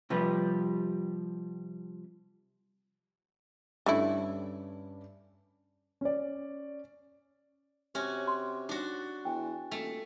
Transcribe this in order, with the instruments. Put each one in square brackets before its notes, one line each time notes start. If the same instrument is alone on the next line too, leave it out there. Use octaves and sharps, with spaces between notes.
[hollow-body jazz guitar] C3 F3 G3 B4
[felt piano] G2 C#4 D4 [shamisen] D3 A3 E4
[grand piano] C#4 D5
[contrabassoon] C3 [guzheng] C#4 F#4
[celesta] C6
[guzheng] D4 F#4 [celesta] D#4
[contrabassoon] E2 [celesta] G5 G#5
[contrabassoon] D#1 [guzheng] A3